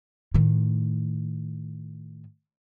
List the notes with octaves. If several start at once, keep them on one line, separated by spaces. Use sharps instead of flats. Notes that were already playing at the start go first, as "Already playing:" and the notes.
A2 D#3